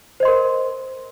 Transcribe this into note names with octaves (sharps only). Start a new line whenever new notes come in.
A#4 C5 D#5 C6